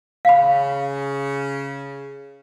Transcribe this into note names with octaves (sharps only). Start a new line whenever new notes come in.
C#3 F5 B5